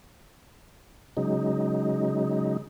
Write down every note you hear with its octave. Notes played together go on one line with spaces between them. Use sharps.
C#3 F#3 G#3 D#4